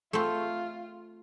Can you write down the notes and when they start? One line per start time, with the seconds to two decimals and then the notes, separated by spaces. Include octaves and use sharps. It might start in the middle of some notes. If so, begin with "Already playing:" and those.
0.13 A3 C4 F4